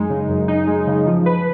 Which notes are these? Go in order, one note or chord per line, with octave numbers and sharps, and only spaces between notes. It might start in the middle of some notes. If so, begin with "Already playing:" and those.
Already playing: F#2 G#3 D#4
C#3
F#2
D#4
G#3
C#3
F3
B4